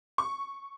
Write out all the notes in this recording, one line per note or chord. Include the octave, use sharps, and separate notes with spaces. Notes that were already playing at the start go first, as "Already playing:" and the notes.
C#6